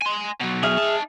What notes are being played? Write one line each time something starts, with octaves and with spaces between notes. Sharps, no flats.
G#5 C6
B2 F#3
G#4 E5 F6
D#4 A5